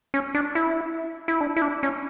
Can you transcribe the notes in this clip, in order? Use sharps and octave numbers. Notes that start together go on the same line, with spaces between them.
C#4
D4
E4
E4
D4
E4
D4
C#4